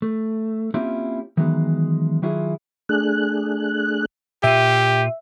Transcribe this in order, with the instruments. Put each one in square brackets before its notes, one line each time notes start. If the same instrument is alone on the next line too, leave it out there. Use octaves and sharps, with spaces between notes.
[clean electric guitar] A3
A#3 C4 C#4 E4 F4 G4
D#3 E3 F#3 G#3 B3
D#3 F#3 E4 F4 G#4
[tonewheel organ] A3 D4 G#4 F#6
[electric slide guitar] A#2 F4 [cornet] G4 [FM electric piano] E5